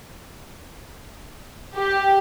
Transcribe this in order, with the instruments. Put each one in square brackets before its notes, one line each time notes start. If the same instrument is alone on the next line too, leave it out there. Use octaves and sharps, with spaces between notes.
[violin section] G4